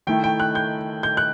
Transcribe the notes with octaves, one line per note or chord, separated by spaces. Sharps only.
D#3 A3 E4 G5
G5
F#6
G6
G6
F#6